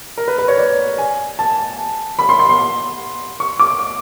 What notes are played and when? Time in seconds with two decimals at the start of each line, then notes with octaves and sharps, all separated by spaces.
0.18 A#4
0.28 B4
0.38 B4
0.48 C#5
0.58 D5
0.98 G#5
1.39 A5
2.19 B5
2.29 C6
2.39 C6
2.49 C6
3.40 C#6
3.59 D6